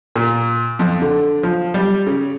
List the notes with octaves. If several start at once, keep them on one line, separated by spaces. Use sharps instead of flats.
A#2
F2
D3
F3
G3
C#3